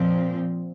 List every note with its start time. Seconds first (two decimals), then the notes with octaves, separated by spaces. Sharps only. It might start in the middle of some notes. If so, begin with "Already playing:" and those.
Already playing: A#2 F3 C4